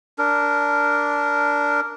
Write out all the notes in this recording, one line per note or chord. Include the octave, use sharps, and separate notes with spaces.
D4 A#4